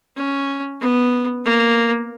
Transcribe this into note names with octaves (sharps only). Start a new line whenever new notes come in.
C#4
B3
A#3